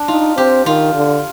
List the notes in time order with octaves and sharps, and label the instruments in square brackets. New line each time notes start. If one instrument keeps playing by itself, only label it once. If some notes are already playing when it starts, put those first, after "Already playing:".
Already playing: [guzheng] D4
[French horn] D#4 [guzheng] F4
[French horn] C4 [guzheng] G4
[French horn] D#3 [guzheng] F4
[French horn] D3